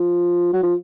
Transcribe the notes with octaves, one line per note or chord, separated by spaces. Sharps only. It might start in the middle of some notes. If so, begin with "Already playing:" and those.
Already playing: F3
F#3
F3